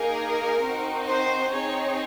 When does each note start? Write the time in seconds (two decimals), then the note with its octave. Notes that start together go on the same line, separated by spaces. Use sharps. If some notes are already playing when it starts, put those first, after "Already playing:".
Already playing: A#3 D#4 G#4 A#4
0.63 C4 D#4 F#4
1.08 C5
1.52 C4 D#4 G#4 C#5